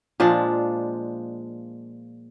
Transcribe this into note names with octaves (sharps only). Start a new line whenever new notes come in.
A#2 F3 G#3 D4